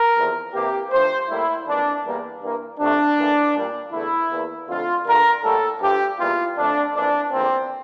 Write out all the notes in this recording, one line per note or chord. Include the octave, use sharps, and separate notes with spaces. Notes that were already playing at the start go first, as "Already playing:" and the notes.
Already playing: A#4
E2 C3 F3
C3 E3 A#3 G4
G2 F3 A3 C5
A2 G3 A#3 E4
F2 E3 A#3 D4
E2 E3 G3 A#3
G2 E3 A#3
C3 F3 A3 D4
A2 E3 A#3
A#2 G3 A#3
E2 D3 A3 E4
E2 E3 A#3
F2 D3 A3 F4
G2 D3 A3 A#4
A2 G3 A#3 A4
G2 F3 A3 G4
E2 E3 G3 A#3 F4
F2 D3 A3 D4
F2 E3 A#3 D4
E2 D3 F3 A#3 C4